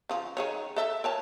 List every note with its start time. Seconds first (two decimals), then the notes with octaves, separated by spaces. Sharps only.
0.09 C#3 F3
0.37 D#3 G#4 C#5
0.76 A4 E5
1.04 A#4 C#5 A5